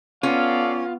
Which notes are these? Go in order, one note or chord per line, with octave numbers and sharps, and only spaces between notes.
B3 C#4 F4 A4 D5 F5